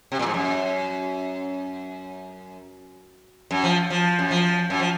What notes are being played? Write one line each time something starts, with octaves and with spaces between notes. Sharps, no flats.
C3
A#2
G#2
F#2
F#2
F3
F3
F#2
F3
F#2
F3